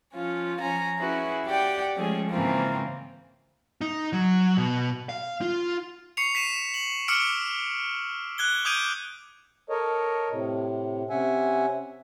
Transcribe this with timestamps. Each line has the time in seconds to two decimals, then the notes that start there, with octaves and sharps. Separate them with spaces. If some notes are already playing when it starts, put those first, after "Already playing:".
0.13 F3 C#4 F4
0.59 F3 C#4 G#5 A#5
0.98 C#4 E4 F#4 G#4 B4
1.45 G4 D5 F#5 G5
1.94 F3 G#3 A3 C#4 G#4
2.30 G#2 C#3 E3 A#3 C4 F4
3.81 D#4
4.13 F#3
4.57 B2
5.09 F5
5.41 F4
6.17 C#6 C7 C#7 F7
6.35 B6 C7 D#7 E7
6.74 F#7
7.08 D6 E6 F6 C#7 D7
8.38 F#6 G#6 G7
8.65 D6 D#6 G6 G#6 D7 D#7
9.70 A4 A#4 C#5 D#5
10.30 A2 C3
11.10 C3 C#4 E5 F#5 G#5